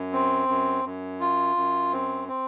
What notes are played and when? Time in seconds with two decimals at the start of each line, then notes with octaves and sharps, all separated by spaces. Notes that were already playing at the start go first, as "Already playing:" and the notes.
Already playing: F#2
0.13 C4
0.48 F#2
0.84 F#2
1.20 F4
1.56 F#2
1.93 C4
2.28 C4